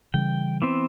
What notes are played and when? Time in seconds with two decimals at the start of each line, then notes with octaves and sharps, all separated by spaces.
0.14 C#3 E3 G3 G5
0.62 E3 B3 C4